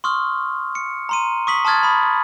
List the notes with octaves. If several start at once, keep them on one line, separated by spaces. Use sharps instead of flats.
C6 C#6 D#6 F6
C#7
A#5 C6 D#7
C#6 D#6 B6 F#7
A5 C6 D#6 F6 G#6 A6
B5 D#6